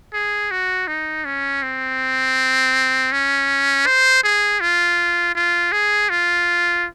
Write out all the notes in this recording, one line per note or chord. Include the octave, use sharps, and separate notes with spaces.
G#4
F#4
D#4
C#4
C4
C#4
C5
G#4
F4
F4
G#4
F4